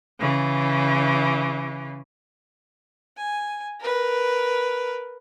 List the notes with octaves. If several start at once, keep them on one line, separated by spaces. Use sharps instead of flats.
C#3 E3
G#5
A#4 B4